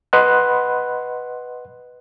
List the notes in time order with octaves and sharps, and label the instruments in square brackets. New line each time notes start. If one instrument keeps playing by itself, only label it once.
[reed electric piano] B4 D#5 F#5 B5 C6 F#6